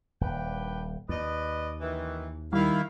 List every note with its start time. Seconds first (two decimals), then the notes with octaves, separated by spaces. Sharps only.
0.21 D#1 D4 B4 G5
1.09 D#2 B4 D5 D#5
1.81 F#2 D#3 E3
2.53 D#3 G3 E4 F5